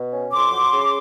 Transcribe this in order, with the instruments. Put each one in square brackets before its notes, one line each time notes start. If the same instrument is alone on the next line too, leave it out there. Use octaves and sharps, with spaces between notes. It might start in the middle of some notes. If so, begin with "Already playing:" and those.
Already playing: [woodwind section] B2
C#4
F2 C6 D6
F#3
C#3